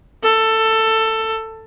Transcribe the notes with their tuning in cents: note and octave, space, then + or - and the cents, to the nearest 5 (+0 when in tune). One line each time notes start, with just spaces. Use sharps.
A4 +15